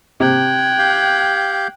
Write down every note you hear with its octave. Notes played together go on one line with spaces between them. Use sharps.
C3 G5 F#6 G#6
G4 F5 G6